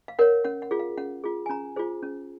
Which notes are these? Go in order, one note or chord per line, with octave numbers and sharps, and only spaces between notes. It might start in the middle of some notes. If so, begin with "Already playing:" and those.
F5
A#4 C#5 F#5
C#4 F#5
F#5
F4 G#4
F5
C#4 F#5
F4 G#4
G#5
C#4 A#5
F4 G#4 C5
C#4